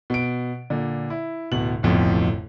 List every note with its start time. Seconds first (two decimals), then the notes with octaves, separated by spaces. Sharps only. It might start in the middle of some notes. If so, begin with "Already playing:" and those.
0.10 B2 D7
0.70 A#2 D3
1.10 E4
1.52 D1 B2 F#7
1.83 D1 A1 F2 B2